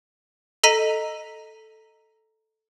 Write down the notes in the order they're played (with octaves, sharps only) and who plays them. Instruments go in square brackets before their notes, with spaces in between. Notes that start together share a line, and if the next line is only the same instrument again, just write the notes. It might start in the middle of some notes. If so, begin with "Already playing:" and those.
[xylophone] A4 D#5 A#5 B6 D#7